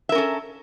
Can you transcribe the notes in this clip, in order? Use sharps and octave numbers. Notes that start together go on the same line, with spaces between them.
C#4 A4 A#4 E5